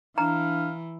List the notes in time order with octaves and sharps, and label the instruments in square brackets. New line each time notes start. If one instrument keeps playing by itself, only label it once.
[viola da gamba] E3 [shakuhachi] D4 [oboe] F5 [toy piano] A#5